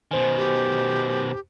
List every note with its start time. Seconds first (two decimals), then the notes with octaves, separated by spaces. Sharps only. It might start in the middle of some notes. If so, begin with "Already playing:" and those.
0.11 B2 D#3 C5 G#5
0.37 G4